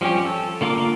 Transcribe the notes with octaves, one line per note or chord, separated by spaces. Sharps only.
F3 G3 C4 C#4 G4
A4
D3 A#3 F4 A#4 D6